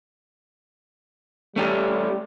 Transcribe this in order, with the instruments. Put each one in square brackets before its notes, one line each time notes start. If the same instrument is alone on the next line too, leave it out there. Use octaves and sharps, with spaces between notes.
[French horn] G3 [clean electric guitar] A3 C#4 G4